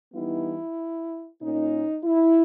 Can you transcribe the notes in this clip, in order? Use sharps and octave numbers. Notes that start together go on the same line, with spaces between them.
E3 G3 B3 D#4 E4
A#2 A#3 C#4 D#4
E4